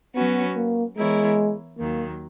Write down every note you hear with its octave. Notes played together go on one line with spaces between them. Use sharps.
F#3 B3 C#4 F#4 B4
A#3
E3 G#3 B3 E4 A#4 C#5
D#2 D#3 F#3 A#3